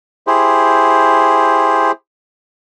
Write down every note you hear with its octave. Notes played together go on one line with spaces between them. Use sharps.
E4 G4 G#4 C5